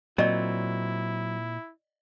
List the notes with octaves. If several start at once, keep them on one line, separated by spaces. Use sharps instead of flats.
A#2 F#3 C4 E4 D5 D#5